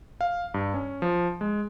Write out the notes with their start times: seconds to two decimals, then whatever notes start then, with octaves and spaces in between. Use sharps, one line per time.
0.21 F5
0.54 G2
0.74 C#4
1.02 F3
1.41 G#3